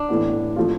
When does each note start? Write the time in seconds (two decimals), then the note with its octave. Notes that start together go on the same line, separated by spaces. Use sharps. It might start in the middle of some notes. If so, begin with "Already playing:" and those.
Already playing: D4
0.09 A2 E3 B3
0.56 F3 A3 C4 F4